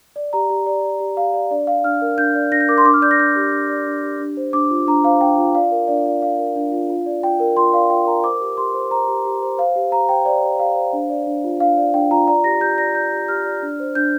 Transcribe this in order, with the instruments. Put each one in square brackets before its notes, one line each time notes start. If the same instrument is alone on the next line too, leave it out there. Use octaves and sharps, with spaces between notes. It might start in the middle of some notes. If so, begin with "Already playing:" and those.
[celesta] D5
G4 A#5
G4
D5
D5
G4
G4 F5
D5
D4 D5
D5 F5
D4 F6
A#4
D4 G6
D5
D4 A#6
G6
A#4 D6
C6
D4 D6
F6
D5 G6
A#6
D4 G6
G4
D4
D5
D4
G4
D4
C5
D4 D6
F4
D4 A#5
C5 F5
D4 G5
F4
D5 F5
A#4
D4 D5
F4 D5
D5 F5
A#4
D4
F4
F4
D5
F4 G5
A#4
F4 C6
D5 F5
F4 G5
A#4 A#5
C5 D6
G4
G4 C6
C5
C5 A#5
G4
G4
C5
C5 F5
G4
G4 A#5
C5 G5
C5 D5
G4
G4 F5
C5
D4
D5
D4
F4
D4 F5
D5
D4 G5
F4 A#5
D5 A#5
G4 A#6
G4 G6
D5 A#6
D5 G6
G4
G4 F6
D5
D4
C5
D4 G6